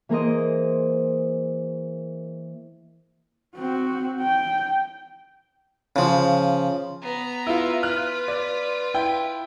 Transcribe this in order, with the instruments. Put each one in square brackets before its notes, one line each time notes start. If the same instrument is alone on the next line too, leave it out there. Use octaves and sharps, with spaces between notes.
[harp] E3 A#3 G#4 A#4 C5 D#5
[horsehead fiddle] C4 F#4
G5
[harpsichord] C#3 F3
[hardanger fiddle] B3 A#5
[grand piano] E4 F4
[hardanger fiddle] F4 B4 [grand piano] F6 F#6
[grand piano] D5
E4 G5